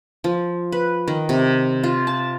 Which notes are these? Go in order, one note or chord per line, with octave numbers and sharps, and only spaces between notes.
F3
B4
D#3
C3
F4
A5